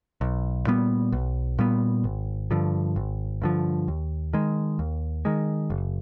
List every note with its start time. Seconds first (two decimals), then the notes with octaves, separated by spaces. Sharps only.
0.21 B1
0.67 A#2 G3 B3
1.12 B1
1.59 A#2 G3 B3
2.04 G#1
2.51 G2 D3 F3
2.96 G#1
3.42 G2 D3 F3
3.88 D#2
4.33 D#3 G#3
4.79 D#2
5.25 D#3 G#3
5.70 F#1